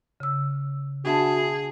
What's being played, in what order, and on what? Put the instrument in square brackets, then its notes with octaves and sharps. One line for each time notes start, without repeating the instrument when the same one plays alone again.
[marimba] C#3 E6
[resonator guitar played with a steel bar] B2 E5 A5 [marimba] D4 [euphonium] F#4 [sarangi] G#4